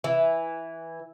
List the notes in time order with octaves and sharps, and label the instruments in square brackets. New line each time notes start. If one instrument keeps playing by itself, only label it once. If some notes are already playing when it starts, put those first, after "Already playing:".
[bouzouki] E3